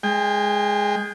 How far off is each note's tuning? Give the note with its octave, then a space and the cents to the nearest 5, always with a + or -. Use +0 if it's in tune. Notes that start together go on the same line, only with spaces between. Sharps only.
G#3 +0 G5 +35